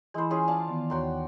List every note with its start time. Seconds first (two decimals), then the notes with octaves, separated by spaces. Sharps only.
0.14 E3 G#3 E4 C5 B5
0.31 C#4 F4 G#4
0.48 D5 F5 A5
0.67 D#3 B3
0.90 D#2 F#4 C#5 G5 A#5 C6